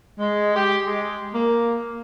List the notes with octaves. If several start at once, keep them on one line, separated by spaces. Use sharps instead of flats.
G#3
G4
G#3
A#3